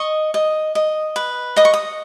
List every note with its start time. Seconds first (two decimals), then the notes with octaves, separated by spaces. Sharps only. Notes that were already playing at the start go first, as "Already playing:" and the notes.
Already playing: D#5 C#6
0.34 D#5
0.75 D#5
1.16 B4
1.56 D#5 D#6
1.65 C#6
1.74 D#6